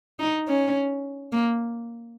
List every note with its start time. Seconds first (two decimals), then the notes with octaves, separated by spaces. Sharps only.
0.19 D#4
0.48 C#4
1.32 A#3